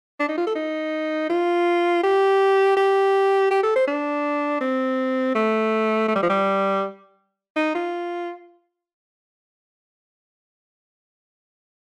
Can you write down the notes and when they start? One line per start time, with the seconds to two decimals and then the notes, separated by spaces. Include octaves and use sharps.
0.20 D4
0.29 D#4
0.38 F4
0.47 A4
0.56 D#4
1.29 F4
2.03 G4
2.77 G4
3.51 G4
3.63 A4
3.76 C5
3.88 D4
4.61 C4
5.35 A3
6.08 A3
6.16 G3
6.23 F3
6.30 G3
7.56 D#4
7.75 F4